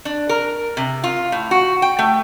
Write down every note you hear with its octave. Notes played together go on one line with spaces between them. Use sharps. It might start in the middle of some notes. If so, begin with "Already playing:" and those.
D4
A#4
C3
F4
A2
F#4
G5
A3